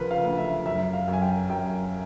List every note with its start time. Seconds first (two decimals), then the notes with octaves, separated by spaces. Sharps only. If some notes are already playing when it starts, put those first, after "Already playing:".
Already playing: D2 C#3 F3 A#4 B4
0.11 F5
0.24 D2
0.38 E5
0.65 F#2 E5
0.93 F5
1.08 F#2
1.13 G#5
1.22 G5
1.50 F#2 G5